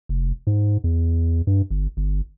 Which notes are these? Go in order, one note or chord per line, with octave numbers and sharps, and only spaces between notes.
F1
G#2
E2
G2
G1
G1